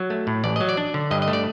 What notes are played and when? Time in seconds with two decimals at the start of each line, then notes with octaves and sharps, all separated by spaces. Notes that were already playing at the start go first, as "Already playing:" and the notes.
Already playing: F#3
0.10 A3
0.27 A2
0.44 A1 D5
0.56 F#3 D#5
0.69 D5
0.77 D4
0.94 D3
1.11 G2 D#5
1.22 D#5
1.28 A3
1.33 D5